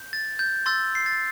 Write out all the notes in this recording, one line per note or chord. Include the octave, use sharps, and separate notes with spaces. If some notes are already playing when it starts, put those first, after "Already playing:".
Already playing: G6
A6
G6
C6 E6 G6 A6
C7
A6